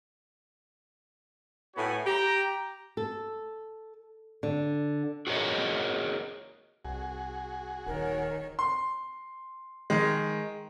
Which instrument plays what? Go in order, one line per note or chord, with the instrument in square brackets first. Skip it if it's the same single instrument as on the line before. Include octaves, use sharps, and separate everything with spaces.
[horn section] A2 A3 B3 F#4 C#5 G#5
G4 A#5
[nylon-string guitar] A4
D3
[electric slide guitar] F#4 G#4 A#4 C#5 D#5
[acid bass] C2 [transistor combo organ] F#4 G#4
[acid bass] D#1 [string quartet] D#3 C#5 [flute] A#4
[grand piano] C6
D#3 G#3